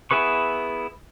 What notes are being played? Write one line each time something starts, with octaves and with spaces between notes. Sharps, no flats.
B3 E4 G#4 B4 C#6